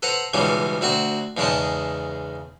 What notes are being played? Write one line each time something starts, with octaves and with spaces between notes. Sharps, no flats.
A4 B4 C5 F#5 A#5
C#2 G#2 B2 E3 G3 C#4
D2 C4 F#4 F#5
E2 G#2 C#3 G#3 G5 A5